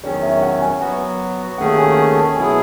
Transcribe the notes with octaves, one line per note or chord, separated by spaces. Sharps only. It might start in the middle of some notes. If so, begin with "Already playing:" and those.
E2 D#3 F#3 C#4 C#5
E5
F#5
G#5
F#3 B3 F#4
D#2 D#3 A3 C#4 G#4 F#5
G#5
G#5
A5
B2 F#3 B3 E4 G#4 G#5